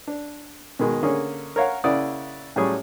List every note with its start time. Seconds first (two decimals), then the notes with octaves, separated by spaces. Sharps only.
0.07 D4
0.79 B2 D#3 G#3
1.03 D3 A#3 C#4 G#4
1.56 A#4 C#5 F5 F#5
1.84 C#3 A#3 E4 D5 F#5 D#6
2.56 A2 F#3 G3 C#4 G#4